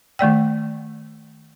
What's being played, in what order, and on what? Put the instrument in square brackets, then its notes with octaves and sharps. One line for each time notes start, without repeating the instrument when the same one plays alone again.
[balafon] D#3 A3 D5 G5